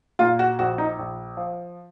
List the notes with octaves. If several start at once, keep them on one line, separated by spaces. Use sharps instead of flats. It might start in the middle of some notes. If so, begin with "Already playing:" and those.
A#2 F4
F#4
A#1 F#4
D#4
A#1
F3